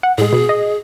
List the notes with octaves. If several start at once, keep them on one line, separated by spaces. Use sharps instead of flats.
F#5
A2 G#3 G#4
B2
D#5